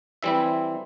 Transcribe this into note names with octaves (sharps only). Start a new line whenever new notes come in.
E3 G3 C4 E4 E5